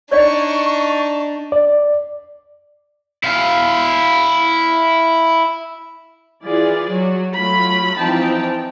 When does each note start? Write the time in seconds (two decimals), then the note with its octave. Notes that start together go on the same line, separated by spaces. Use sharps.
0.11 D4 D#4 C#5 D5 F#5 C#6
1.52 D5
3.24 E4 F5
6.45 E3 F4 G#4 D5
6.91 F#3 F#4
7.34 F#3 A3 F4 B5
7.97 E3 F3 C4 D#4 G5 A5